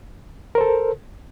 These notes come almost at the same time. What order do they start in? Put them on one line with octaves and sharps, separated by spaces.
A#4 C5 A4